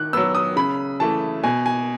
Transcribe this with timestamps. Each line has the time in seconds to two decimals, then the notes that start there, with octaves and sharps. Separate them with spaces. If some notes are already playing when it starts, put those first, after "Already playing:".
Already playing: D#3 F#6
0.13 F#3 B3 E6
0.35 D#6
0.56 C#3 B5
1.00 E3 A3 A5
1.44 B2 G#5
1.66 G#5